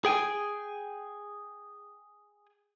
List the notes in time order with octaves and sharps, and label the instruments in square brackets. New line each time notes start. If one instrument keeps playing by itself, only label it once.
[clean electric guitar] G#4 G5 G#5